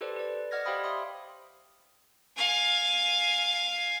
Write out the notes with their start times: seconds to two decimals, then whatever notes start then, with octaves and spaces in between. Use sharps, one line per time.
0.01 G4 A4 B4 C5 D5
0.16 B4 D5
0.51 D5 D#5 F#5 F6 G#6 A#6
0.65 G4 C5 F5 G5 B5 D#6
0.84 E5 B5 C6 D#6
2.36 F5 G#5